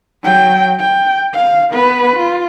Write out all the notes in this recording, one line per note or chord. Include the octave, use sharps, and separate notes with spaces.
F#3 G5
G5
F5
B3 B4
F4